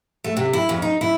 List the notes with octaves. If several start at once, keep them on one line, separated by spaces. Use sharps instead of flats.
A3
C3
E4
F2
D#4
E4